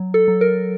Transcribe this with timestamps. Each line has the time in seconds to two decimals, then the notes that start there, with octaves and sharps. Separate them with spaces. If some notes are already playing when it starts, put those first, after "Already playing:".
Already playing: F#3
0.14 A4
0.28 F#3
0.41 A#4